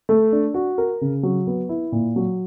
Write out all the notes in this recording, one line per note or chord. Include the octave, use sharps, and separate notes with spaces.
A3
D4
F#4
A#4
C#3
F#3
B3
E4
A#2
F#3